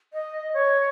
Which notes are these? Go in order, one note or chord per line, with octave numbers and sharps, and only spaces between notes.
D#5
C#5